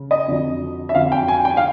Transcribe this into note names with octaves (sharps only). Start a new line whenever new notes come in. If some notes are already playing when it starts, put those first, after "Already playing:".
Already playing: C#3
D#5
F2 D3 F#3
E5
F2 D3 F#3 F5
G5
G#5
G5
F5